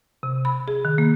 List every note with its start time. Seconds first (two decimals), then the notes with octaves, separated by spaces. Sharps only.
0.23 C3
0.45 B5
0.68 G#4
0.85 D#3
0.98 A#3